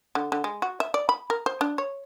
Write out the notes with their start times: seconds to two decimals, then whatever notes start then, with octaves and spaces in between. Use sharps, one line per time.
0.15 D3
0.32 D3
0.44 G#3
0.62 F#4
0.80 E5
0.94 D5
1.09 B5
1.30 A#4
1.46 C5
1.61 D4
1.78 C#5